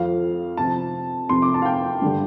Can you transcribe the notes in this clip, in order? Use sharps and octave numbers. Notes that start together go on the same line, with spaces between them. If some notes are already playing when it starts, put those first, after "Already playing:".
Already playing: F2 F3 C4 F5
C3 F3 C4 A5
F2 C3 F3 C6
D6
A5
F5
G5
G2 D3 G3